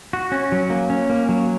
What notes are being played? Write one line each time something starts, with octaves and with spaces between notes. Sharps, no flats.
F#4
C#4
F#3
A#3
C#4
A#3
F#3